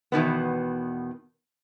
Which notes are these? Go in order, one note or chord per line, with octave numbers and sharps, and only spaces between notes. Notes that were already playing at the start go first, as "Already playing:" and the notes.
E2 B2 D#3 B3